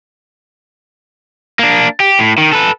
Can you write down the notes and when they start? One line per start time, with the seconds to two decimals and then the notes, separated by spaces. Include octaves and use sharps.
1.59 A#3 D4
2.00 G4
2.19 A2
2.38 D#3
2.53 A4 B4